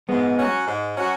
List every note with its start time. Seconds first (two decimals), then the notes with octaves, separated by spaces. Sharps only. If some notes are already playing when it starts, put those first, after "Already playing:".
0.09 G#2 G#3 B3
0.38 F#3 C#4 F#4
0.67 G#2
0.96 F#3 C#4 F#4